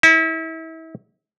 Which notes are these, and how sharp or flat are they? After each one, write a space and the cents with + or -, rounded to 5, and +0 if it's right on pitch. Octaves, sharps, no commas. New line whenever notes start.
E4 -35